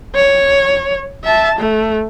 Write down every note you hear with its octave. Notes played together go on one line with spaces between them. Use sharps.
C#5
E5 A5
A3